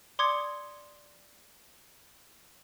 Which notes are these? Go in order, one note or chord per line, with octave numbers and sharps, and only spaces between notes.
D5 C6 D6 D#6 G#6 C#7